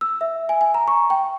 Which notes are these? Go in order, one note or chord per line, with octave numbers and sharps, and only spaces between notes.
E6
E5
G#5
G#5
A#5
C#6
G5